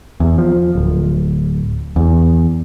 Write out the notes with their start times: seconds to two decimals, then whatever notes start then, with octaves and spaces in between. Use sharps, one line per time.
0.20 E2
0.38 F3
0.75 D1
1.96 E2